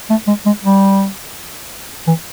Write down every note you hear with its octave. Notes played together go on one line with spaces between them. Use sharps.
A3
G#3
G#3
G3
E3